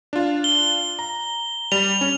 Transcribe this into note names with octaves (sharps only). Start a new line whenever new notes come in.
D4 F4
G7
A#5
G3 F7
C#4